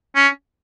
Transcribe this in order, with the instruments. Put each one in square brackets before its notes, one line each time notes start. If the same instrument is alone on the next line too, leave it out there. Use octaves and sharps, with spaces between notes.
[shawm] C#4